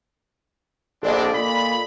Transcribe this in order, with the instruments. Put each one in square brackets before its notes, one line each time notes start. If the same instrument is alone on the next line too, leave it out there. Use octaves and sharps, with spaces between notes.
[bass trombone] A#1 [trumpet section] C4 D4 [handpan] A4 D5 D#5
[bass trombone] A#2 [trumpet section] B5